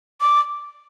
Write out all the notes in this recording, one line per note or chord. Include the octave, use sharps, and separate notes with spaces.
D6